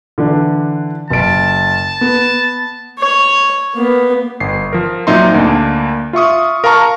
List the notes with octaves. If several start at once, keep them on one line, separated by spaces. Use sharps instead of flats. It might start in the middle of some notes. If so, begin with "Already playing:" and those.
D3 E3 D4
F#1 A5 D7
B3
C#5
A#3 B3
G1 C7
F3 A#4
A#2 F#3 C4 D#4 E5 C6
D2 A#3 D4
F4 E5 C#6 D#6
A#4 F5 A5 A#5 C#6